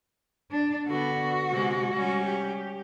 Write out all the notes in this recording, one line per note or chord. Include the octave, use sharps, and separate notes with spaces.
D4 D5
D3 B3 F#4
C3 G#3
G3 C#4
G4